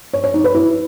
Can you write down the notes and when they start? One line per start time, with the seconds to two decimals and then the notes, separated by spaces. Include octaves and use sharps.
0.13 C#5
0.24 C#5
0.34 D#4
0.44 B4
0.55 E4